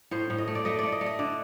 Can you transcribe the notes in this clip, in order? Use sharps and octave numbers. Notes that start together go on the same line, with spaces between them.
A2 C5
A2
D#5
A3
D5
A3 D#5
A3 D5
D#5
A3
D#5
D3 D5